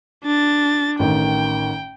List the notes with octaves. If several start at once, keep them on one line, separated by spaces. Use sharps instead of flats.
D4 A6
A1 D#3 G5